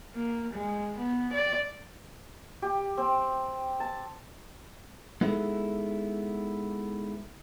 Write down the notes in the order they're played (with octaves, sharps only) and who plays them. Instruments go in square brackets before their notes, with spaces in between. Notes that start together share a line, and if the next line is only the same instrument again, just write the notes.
[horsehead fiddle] A#3
G#3
B3
D5
[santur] G4
C4
A5
[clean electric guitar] G#3 B3 D#4 E4 G#4 A4